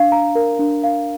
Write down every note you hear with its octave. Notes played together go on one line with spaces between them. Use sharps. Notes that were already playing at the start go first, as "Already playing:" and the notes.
Already playing: D4 F5
A#5
A#4
D4
F5